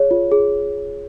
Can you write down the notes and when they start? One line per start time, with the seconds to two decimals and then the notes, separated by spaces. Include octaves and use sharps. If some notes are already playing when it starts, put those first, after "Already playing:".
Already playing: G#4 C#5
0.11 F4
0.32 G#4